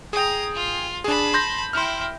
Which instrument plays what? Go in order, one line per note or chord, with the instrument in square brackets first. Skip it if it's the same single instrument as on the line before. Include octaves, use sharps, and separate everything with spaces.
[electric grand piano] G#4 G5 [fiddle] A#5 D#6
[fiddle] F4
[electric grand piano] D4 G#4 [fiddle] A5 B5
[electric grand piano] C6 G6 A#6
[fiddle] E4 G5 [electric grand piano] C6 F6